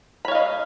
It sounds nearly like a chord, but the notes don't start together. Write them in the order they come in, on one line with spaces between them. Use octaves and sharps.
B5 C#5 F5 D#5